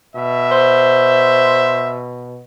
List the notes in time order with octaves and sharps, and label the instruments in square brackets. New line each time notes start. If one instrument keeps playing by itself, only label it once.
[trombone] B2 [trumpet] E5
[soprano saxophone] C5